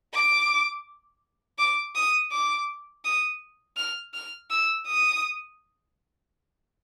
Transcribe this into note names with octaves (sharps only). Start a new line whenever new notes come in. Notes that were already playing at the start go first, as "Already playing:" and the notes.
D6
D6
D#6
D6
D#6
F6
F6
E6
D#6